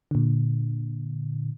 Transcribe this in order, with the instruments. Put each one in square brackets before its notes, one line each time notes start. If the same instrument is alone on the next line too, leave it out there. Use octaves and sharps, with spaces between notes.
[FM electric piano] A#2 D3